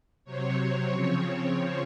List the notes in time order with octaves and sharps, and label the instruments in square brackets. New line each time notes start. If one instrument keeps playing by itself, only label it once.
[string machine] C3 F#3 C4 C#5
C#5
C#3 F3 C4
C#5